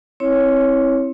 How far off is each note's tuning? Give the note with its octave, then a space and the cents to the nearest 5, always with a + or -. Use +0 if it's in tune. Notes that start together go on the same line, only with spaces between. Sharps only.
C4 +20 E4 -10 C#5 +0